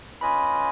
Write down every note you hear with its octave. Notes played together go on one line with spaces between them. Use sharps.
C#4 F4 B4 D#5 G#5 B5